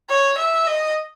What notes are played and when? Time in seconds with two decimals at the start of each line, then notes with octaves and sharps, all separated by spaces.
0.09 C#5
0.37 E5
0.67 D#5